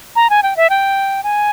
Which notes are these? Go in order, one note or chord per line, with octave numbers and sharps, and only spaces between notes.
A#5
G#5
G5
E5
G5
G#5